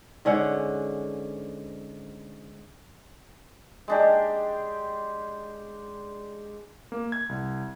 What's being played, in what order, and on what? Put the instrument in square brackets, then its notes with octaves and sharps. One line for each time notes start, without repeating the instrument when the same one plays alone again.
[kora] G#2 D3 C#4 F#5
[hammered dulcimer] G#3 D4 G4
[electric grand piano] A#3
G#6
C2